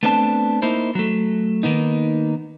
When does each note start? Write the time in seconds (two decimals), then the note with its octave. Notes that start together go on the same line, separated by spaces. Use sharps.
0.03 A3 B3 C4 D4 D5 A5
0.62 A#3 D#4 E4 C5
0.95 F#3 A3
1.63 D#3 A#3 B3 D#4